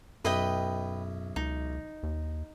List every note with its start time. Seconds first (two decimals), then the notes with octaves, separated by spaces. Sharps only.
0.25 B1 F#2 E4 B4 D#5 G5
1.36 C#2 D#4
2.03 D#2